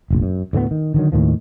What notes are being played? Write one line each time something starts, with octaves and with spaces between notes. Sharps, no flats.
F1 A#1
F#2
D2 A2 G#3 B3
D#3
D3 D#3 F#3
D#2 A2 D#3 F3